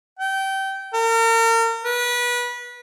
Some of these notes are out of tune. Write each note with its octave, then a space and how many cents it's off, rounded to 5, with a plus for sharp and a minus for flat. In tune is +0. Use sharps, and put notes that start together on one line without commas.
G5 -25
A#4 -35
B4 -25